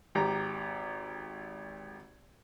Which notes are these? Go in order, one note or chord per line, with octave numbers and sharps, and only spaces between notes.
G#1 G4 A#5